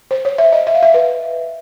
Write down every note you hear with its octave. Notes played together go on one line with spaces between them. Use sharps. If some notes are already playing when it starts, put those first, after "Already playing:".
C5
C#5
E5
D#5
E5
F5
E5
B4